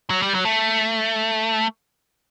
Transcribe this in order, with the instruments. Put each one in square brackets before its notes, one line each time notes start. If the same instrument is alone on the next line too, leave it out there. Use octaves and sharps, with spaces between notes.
[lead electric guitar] F#3
G3
F#3
A3